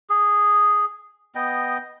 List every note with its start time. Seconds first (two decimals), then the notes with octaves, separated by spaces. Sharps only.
0.10 G#4
1.35 B3 D#5 G5